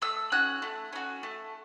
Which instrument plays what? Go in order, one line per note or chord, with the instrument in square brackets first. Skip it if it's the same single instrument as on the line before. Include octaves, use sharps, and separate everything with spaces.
[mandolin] A3 E6
C#4 F#4 F#6
A3
C#4 F#4
A3